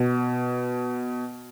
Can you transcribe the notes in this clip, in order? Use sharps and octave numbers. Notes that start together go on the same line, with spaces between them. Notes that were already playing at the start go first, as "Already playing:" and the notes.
Already playing: B2